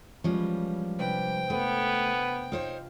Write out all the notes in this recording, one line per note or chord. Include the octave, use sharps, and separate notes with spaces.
E3 F3 G3 G#3 C#4
C3 D4 B4 G5
A3 B3
D#4 F4 C5 C#5